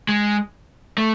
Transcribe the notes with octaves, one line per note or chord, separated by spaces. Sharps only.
G#3
A3